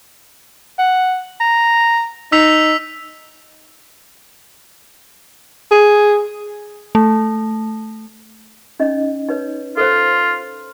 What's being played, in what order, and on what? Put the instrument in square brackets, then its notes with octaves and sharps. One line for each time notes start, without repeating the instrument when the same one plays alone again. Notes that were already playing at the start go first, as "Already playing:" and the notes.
[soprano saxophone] F#5
A#5
[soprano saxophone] D#4 [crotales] E6 B6 F7
[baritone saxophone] G#4
[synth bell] A3
[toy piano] C#4 D#4 D#5
D#4 B4 C#5
[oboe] F4 [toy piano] A4 C5